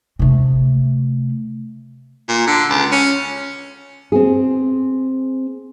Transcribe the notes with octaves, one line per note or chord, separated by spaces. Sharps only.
C3 A3
A#2
D3
C#2
C#4
C4 G#4